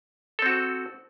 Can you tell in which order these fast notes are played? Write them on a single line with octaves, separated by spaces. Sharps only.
A4 C4 F#4